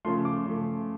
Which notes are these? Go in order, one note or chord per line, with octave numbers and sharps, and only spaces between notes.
C#3 F3 A3 C6
D6
C#3 F3 A3